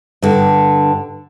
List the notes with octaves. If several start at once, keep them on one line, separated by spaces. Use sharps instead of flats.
G2 D3